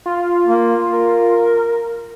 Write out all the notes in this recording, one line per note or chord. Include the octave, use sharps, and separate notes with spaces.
F4
A#3
A#4